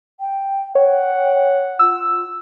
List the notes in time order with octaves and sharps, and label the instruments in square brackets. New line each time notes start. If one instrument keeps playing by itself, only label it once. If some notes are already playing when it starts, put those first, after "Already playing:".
[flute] G5
[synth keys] C#5 [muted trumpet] F#5 [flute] G5
[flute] F4 [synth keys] E6